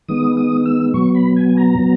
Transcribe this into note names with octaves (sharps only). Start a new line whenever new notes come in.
D#3 G#3 B3 D#6
D#6
E6
B2 F#3 B3 C#6
B5
G#5
G#5
A#5
B2 F#3 B3